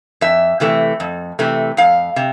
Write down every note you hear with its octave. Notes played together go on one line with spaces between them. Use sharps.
F2 E5
C3 E3 A3
F2
C3 E3 A3
F2 F5
C3